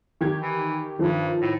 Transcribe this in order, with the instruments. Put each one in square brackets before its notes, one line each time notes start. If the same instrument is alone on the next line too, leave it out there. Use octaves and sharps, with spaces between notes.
[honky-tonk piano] D#3 G4 G#6
[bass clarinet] E3
[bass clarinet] G2 [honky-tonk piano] D#3 F3
[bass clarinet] A2